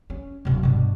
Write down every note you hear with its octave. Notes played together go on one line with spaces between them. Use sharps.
C#4
D1 B2
G2 B2